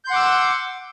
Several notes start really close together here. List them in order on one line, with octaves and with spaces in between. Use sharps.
G6 C6 F#5 D6 E6